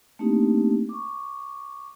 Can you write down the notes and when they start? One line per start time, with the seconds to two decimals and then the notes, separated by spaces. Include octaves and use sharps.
0.19 A3 A#3 C4 D4 D#4 G4
0.89 C#6 D6